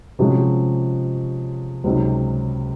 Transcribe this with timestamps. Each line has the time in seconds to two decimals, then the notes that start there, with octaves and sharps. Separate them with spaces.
0.19 C3 F3 G#3 C#4 F#4
1.84 C#2 C3 F#3 C4 D#4